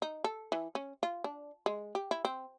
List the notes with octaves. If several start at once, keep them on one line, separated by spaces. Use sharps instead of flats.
D#4
A4
E3
C#4
F4
D4
G#3
G4
E4
C4